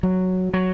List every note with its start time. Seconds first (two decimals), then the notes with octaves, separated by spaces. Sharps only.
0.03 F#3
0.54 F#3